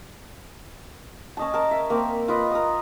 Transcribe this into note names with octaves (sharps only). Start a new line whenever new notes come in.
C#4 D#5 A5
A#4 A5
E5
A#3 C4
F4 B4 D#5
A#4 D#6